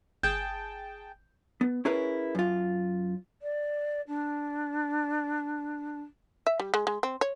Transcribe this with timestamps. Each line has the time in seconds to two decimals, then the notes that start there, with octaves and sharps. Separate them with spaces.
0.23 G1 G#4 G5 A5 G6
1.61 B3
1.85 C#4 E4 G#4 A#4 B4 C#5
2.35 F#2 F4
3.42 D5
4.07 D4
6.47 E5
6.60 G3
6.74 G#3
6.87 G#3
7.03 C4
7.21 C#5